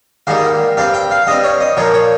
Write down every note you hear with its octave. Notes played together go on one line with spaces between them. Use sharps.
G#2 D#3 G3 A#3 F5
G2 G3 C4 F5
G5
F5
G2 G3 C4 D#5
C#5
D#5
A#2 F3 A#3 C#5
C#5